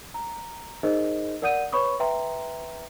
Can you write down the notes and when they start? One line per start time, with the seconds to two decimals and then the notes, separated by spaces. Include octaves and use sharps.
0.14 A#5
0.83 D#4 G#4 A#4 C5 D#5
1.42 A#4 D5 F#5 D#6 G6 D#7
1.72 B4 C#5 B5 C#6 D#6
2.00 B4 E5 G5 A#5 C6